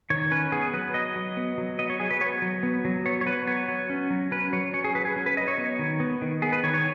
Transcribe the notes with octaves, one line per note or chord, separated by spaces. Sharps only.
D#3 C#5
C#4 B4
B3 G#4
F#3 B4
B3 D#5
F#3
B3
F#3
B3 D#5
C#5
F#3 G#4
B4
B3 C#5
F#3
B3
F#3
B3 C#5
C#5
F#3 B4
B3 C#5
F#3
C#4
F#3
C#4 B4
F#3 C#5
C#4 C#5
G#4
F#3 B4
G#4
C#4
B4
F#3 D#5
C#5
B3
D#3
B3
D#3
B3 G#4
B4
D#3 C#5
C#5